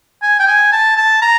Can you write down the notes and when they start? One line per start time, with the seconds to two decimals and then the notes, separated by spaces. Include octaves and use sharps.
0.22 G#5
0.39 G5
0.47 G#5
0.72 A5
0.97 A5
1.22 A#5